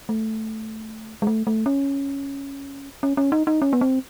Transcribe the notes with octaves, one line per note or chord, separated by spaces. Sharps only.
A3
G#3
A3
A3
C#4
C#4
C#4
D#4
D#4
C#4
B3
C4